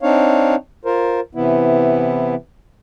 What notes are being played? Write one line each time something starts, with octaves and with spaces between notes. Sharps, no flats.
C4 D4 D#4 C#5 F5
F4 A#4 C5
C3 E3 B3 E4